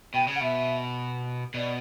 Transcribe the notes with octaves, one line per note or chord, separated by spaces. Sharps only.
B2 G5
C#3
F#5
B2 E5
B2 D5